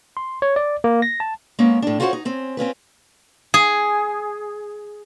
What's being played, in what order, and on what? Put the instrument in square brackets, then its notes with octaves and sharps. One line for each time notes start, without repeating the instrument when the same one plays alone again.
[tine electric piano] C6
C#5
D5
A#3
A#6
A5
[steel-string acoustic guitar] G#3 A#3 B3 C#4
A2 D4
F4 F#4 A4 C5 C#5 F#5
D#4
C4 C#4
C4 C#4 F4 B4
[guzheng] G#4